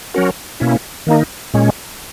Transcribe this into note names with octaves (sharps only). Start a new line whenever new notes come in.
F#3 C#4 F#4 A#4
B2 A#3 C#4 E4
D#3 A#3 D#4
A#2 G#3 C#4